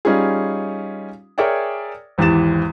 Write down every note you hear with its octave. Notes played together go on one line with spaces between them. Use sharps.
G3 C#4 D#4 F4 G#4
G#4 A#4 C#5 D5 E5 G5
G#1 E2 E3 G4 A6 E7